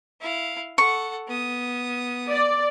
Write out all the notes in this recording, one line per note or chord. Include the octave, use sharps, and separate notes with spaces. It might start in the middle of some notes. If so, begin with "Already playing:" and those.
E4 F5
A4 F#5 C#6
B3 D#6
D5